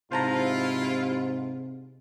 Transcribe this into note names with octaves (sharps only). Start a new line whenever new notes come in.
G#2 C3 E4 F4 C5 A5 A#5